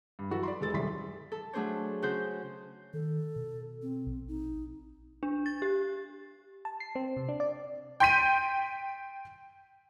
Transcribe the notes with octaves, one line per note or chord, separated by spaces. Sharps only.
G2
E3 F#3 F#4 A4 B4
D5 B5 C6
E1 G#3 A4 A6
D#1 C2 F#2 C6 B6
A4
F#3 A3 D4 G#4 C5 C#5
C#3 F#4 C5 G6
D#3 A4
B2
C4
A#1
D#4
D4
A6
G4
A5
C7
C4
C3
D4
D5
G5 C6 G6 B6 D#7